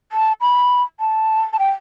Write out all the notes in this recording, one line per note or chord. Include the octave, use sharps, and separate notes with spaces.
A5
B5
A5
A5
G5